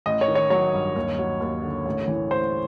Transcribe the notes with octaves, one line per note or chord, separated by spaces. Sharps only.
A1 D#5
C#5
D#3
C#5
F#3 C#5
G2
D#2
F#3
D#2
D3
A1
E3
A1 C5